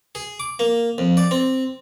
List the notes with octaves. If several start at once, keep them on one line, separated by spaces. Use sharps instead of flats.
G#4
D6
A#3
F2
D5
C4